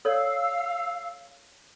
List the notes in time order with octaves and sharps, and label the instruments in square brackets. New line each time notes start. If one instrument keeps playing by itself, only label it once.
[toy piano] A4 C#5 D5 [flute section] F5 E6